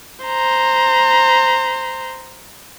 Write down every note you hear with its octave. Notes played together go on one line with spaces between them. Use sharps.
C5 A#5